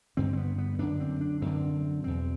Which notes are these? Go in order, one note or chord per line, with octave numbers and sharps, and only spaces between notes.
G2 D3 C4
C4
B3
B3
F#2 D3 D4
C4
D4
F#2 D3 C4
E2 B2 C4